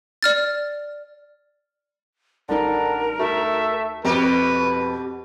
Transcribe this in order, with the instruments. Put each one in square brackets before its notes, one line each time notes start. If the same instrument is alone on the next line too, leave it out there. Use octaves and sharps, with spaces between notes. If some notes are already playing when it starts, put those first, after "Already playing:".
[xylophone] D5 F6 A6
[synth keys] A1 G3 D#4 [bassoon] D3 [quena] A#4
[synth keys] D2 D#4 F#4 [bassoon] A3 [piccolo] E5
[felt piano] F2 [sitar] B2 G4 [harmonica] B4